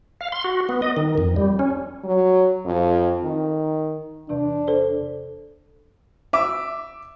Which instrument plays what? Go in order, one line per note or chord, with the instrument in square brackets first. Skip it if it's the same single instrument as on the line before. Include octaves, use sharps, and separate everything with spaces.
[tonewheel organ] F5
C6
F#4
B3
D#5
D#3
F2
G3
C#4
[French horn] F#3
F2
D#3
[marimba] E2 C3 E3 [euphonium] D4
[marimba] A4 C5
[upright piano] E5 D6